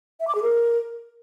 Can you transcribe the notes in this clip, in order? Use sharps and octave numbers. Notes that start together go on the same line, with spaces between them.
E5
D6
G#4
A#4